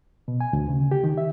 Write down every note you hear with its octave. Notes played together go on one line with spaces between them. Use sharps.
B2
G#5
D2
C#3
G4
D#3
E5